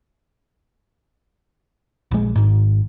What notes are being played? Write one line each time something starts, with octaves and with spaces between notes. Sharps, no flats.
A#1 G#3
G#1 G#2